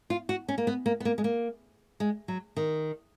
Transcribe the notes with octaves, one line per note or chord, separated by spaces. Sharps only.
F4
F#4
C#4
A#3
B3
A#3
B3
A#3
G#3
A#3
G#3
F#3
D#3